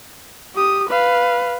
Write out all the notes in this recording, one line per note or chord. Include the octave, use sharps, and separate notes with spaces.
G4 D#6
B4 F5